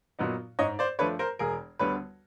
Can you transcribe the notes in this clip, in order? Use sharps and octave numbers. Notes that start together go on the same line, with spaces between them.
A#2 F#3 B3 D#4
G#2 C#5 D#5
C5 D5
F3 A3 D4 B4 C#5
A#4 C5
E1 G#4 A#4
D2 D3 G3 B3 B4 C#5